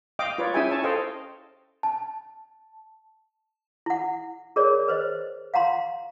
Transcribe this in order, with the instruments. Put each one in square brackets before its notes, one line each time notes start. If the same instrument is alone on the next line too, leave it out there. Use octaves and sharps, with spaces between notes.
[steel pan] D#5 F5 G5 D6
F4 B4 C#5 D5
C#4 E4 G#4 E5 G5 G#5
C#5 A5
A4 C5 D#5 F5 G5
[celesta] A5
[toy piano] E4 F#5
G#4 A#4 C#5 D5
B4 C5 D#5
F5 F#5 A#5 C6